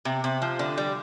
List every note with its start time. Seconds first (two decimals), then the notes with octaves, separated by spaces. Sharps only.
0.05 C3
0.24 C3
0.42 F3
0.59 D3
0.77 G3